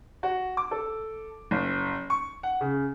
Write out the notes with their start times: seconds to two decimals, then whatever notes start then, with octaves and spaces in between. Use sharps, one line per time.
0.23 F#4
0.57 D6
0.71 A4
1.51 F#1
2.10 C#6
2.43 F#5
2.61 C#3